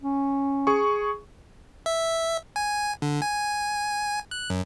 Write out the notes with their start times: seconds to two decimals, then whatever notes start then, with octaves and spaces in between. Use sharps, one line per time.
0.02 C#4
0.67 G#4 C#6
1.86 E5
2.56 G#5
3.02 D3
3.22 G#5
4.31 F#6
4.50 F#2